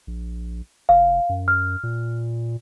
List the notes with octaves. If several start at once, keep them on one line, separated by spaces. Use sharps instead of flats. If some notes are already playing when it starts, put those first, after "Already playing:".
A#1
F1 F5
F#2
F6
A#2